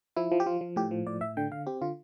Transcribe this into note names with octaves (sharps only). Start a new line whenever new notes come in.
F3 E4
F3
G4
F3 F4
F3
A2 G4
F3
A2 D5
A2 E5
D3 G5
D3 F5
C4 G4
D3 F4